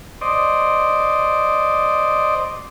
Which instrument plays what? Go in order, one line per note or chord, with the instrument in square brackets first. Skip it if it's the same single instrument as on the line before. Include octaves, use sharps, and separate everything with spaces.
[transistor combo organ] C5 D5 D#5